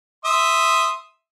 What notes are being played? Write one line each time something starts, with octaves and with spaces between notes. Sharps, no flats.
E5 C6 D#6